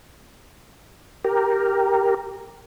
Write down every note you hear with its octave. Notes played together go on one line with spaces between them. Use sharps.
G4 A#4